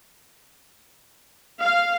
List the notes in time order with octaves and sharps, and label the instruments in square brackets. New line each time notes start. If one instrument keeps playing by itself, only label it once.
[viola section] F5